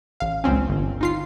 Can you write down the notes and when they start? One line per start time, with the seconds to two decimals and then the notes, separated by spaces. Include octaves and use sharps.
0.20 A1 F5
0.44 C#2 A#2 C4 C#4
0.69 G1
1.01 D#4 F4 C7